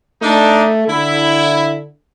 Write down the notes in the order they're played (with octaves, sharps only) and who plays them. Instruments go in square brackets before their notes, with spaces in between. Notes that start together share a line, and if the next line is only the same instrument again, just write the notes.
[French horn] A3 [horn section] D4 D#4
[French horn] D3 [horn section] E4